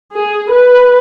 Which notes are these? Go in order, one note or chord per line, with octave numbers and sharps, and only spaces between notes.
G#4
B4